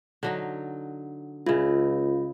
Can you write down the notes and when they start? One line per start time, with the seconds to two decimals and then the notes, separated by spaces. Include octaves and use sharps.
0.23 D3 F#3 D#4
1.46 C#2 C#3 E4 F4